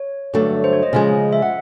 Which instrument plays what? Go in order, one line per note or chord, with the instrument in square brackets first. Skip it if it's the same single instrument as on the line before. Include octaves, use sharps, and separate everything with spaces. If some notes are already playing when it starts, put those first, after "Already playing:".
Already playing: [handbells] C#5
[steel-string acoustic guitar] G2 D3 F#3 A3
[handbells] C5
C#5
D#5
[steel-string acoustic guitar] C#3 F3 G#3
[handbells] E5
F#5